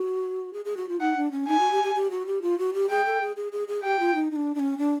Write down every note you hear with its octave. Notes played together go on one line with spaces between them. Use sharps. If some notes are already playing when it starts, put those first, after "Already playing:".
Already playing: F#4
G#4
G#4
F#4
F4
D#4 F#5
D4
C#4
D#4 G#5
F#4
G4
G4
G4
F#4
G4
F4
F#4
G4
G#4 G5
A4
G#4
G#4
G#4
G#4
G4 G5
F4
D#4
D#4
D4
D4
C#4
D4